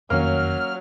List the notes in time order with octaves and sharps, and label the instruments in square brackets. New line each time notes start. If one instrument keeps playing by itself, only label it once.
[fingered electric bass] F#1 F2 D#3 [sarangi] F#3 [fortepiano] A#3 C#4 [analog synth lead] F6